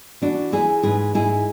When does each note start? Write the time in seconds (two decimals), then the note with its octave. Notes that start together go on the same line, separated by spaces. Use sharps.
0.22 E3 D4 F#4
0.52 E3 E4 G#4
0.83 G#2 G#4 B4
1.15 G#2 E4 G#4